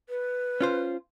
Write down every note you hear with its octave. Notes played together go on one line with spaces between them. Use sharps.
B4
C#4 F4 C5